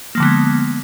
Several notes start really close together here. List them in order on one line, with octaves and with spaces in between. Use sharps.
A#3 F3 D3 B3 G#3